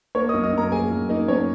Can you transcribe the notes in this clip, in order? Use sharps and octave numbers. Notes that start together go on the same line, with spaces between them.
A#3 C#5 C#6
F#2 D#5 D#6
D#5 D#6
F#2 A#4 A#5
A#3 G#4 G#5
F#2
A#3 D#4 D#5
F#2 C#4 C#5